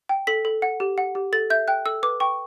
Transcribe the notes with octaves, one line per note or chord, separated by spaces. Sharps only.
G5
A4 B6
A4
F#5
G4
F#5
G4
A4 A6
E5 G6
G5 F#6
A4 E6
B4 D6
G5 C#6